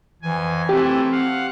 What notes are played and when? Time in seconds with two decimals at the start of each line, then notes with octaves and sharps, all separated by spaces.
0.22 F2 E3 G#5
0.69 E3 A3 C4 E4 G4
1.12 F5 F#5